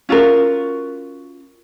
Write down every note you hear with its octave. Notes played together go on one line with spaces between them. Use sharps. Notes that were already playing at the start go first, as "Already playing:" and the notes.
C#4 F4 F#4 A#4